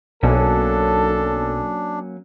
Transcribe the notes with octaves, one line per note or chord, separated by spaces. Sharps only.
B1 F#3 A#3 C#4 D4 A4